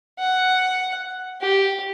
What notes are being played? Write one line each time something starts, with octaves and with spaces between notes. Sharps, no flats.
F#5
G4